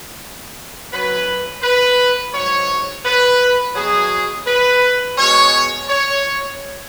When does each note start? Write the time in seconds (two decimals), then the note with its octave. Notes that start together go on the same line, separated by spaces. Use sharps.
0.92 F#2 F#3 B4
1.63 B4
2.34 G#2 F#3 C#5
3.05 B4
3.76 B2 F#3 G#4
4.47 B4
5.18 B2 G#3 C#5
5.89 C#5